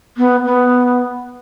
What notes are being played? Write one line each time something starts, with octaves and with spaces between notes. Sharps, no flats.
B3
B3